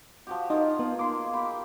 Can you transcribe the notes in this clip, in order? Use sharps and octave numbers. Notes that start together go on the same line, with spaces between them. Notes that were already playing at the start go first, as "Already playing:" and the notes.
F3 F#4 G4
D#4 F4 G#4 A#4 D#5
B3 D#4
A#3 C6 D6
G4 B5